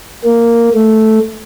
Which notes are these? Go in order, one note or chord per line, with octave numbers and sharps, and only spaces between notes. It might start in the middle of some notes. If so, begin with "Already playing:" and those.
A#3
A3